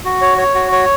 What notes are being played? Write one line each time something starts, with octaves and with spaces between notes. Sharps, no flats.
F#4
C#5
C#5
F#4
C#5